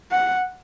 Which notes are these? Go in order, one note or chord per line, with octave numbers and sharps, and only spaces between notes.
F#5